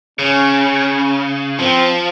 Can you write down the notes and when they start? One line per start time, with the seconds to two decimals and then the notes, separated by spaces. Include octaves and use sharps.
0.19 C#3 C#4
1.59 F3 C4